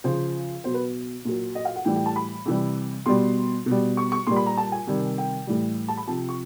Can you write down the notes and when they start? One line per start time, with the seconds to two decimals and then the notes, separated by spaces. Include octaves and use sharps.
0.04 C#3 F3 C5
0.64 B2 F#3 C5
0.74 B4
1.25 A#2 F#3
1.55 D#5
1.65 F5
1.76 F#5
1.85 A2 E3 G3 G5
1.96 G5
2.06 A5
2.16 B5
2.45 C3 E3 G3
3.06 B2 G3 C6
3.66 B2
3.71 G3
3.97 C#6
4.12 C#6
4.27 A#2 G3 C6
4.36 B5
4.46 A#5
4.57 A5
4.72 G#5
4.87 C3 D#3 G3
5.18 G5
5.47 A2 E3 G3
5.88 A5
5.97 B5
6.08 C3 F3 A5
6.29 C#6